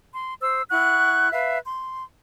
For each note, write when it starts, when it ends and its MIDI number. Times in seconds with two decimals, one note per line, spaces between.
0.13 0.35 84
0.42 0.62 72
0.42 0.62 88
0.70 1.30 64
0.70 1.30 78
0.70 1.30 85
0.70 1.30 90
1.31 1.58 71
1.31 1.58 76
1.31 1.58 77
1.66 2.05 84